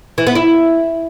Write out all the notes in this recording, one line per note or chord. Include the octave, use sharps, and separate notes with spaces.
E3
B3
E4